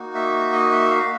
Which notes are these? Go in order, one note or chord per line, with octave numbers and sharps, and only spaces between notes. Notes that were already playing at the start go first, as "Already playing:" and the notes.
Already playing: A#3 D#4 F#4
E5
D#5
E5
F5